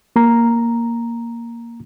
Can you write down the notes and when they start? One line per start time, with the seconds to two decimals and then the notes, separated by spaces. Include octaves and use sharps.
0.16 A#3 A#5